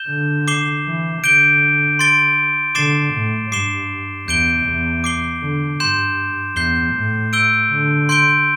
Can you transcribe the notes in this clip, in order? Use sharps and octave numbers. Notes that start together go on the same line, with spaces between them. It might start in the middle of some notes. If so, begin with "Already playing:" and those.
Already playing: G6 E7 G7
D3
D6 C7 E7 G7
E3
D3 G6 D7 G7
C6 A6 D7 G7
D3 D6 A6 C7 E7 G7
A2
G2 D6 C7 E7 G7
E2 G6 D7 G7
E2
D6 C7 G7
D3
G2 C6 G6 E7
E2 G6 C7 G7
A2
E6 G6 D7 G7
D3
C6 G6 D7 G7